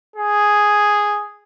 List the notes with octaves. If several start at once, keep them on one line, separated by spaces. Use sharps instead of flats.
G#4